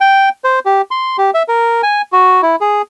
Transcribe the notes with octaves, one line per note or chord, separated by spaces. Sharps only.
G5
C5
G4
C6
G4
E5
A#4
G#5
F#4
E4
G#4